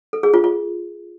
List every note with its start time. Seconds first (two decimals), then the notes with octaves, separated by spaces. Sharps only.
0.13 A4
0.23 G#4
0.34 F4
0.44 F4